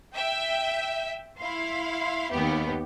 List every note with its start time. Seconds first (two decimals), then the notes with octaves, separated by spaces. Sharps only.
0.15 E5 G5 B6
1.39 E4 F5 C6
2.30 D#2 B3 G4